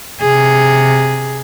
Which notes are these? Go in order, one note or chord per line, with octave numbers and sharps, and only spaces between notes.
C3 G#4